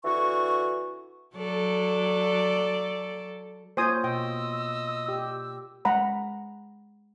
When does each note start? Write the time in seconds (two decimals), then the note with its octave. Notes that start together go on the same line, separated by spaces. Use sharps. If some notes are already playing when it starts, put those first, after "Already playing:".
0.04 D3 E3 F#4 C#6
1.35 F#3 A4 D5
3.77 A#3 F4 C5 C#5 G#5 D#6 G6
4.04 B2 D#5 G5 E6
5.09 G4
5.85 G#3 F#5 A#5 B5